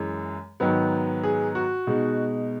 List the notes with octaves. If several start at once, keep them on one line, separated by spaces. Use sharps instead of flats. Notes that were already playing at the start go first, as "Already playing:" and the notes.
Already playing: F#2 E3 G#3
G#2 D#3 F#3 B3
G#4
F#4
B2 G#3 D#4